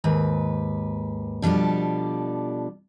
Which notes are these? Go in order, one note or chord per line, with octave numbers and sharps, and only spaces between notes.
D#2 G#2 B4
B2 F3 G3 D4 A4